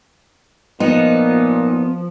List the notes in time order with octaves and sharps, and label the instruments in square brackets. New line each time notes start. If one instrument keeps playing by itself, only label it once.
[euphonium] A#2 [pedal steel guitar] F3 [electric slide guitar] B3 [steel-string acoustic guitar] D#4